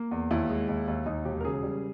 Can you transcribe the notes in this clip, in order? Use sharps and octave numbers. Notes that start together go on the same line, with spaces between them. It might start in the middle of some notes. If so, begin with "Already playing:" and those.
Already playing: A#3
E2
D#2 E4
G#3
D#2
D#2
D#2 D#4
E1 G4
A#4
C#3 G#4
G3